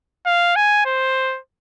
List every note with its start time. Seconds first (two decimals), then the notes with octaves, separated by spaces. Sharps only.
0.26 F5
0.56 G#5
0.86 C5